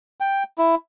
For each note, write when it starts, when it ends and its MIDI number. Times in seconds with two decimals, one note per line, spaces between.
0.20 0.43 79
0.58 0.75 64